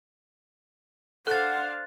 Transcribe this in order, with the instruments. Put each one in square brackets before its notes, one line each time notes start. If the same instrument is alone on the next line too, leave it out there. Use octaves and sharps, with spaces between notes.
[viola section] D4 C5 F5 [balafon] A4 [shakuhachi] F#5 [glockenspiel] F#6 A6